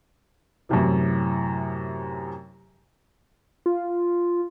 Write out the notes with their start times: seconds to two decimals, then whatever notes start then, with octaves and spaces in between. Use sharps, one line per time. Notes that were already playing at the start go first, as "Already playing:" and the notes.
0.69 F#2 A2 C3 E3
3.66 F4